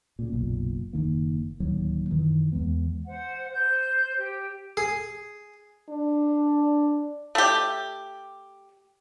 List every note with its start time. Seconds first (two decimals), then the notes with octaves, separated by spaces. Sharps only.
0.19 A#2 C#3
0.32 F#1 B1 A#2
0.93 F#1 E2 D#3 A#3
1.60 D1 D#2 F#3
2.10 F#2 D#3 E3
2.52 E2 E3 G#3 B3
3.07 C5 F#5
3.53 C5 G6
4.17 G4
4.77 G#4
5.90 D4
7.35 A3 G4